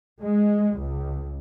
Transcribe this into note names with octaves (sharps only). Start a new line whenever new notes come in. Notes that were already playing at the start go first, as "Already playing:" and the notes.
G#3
C#2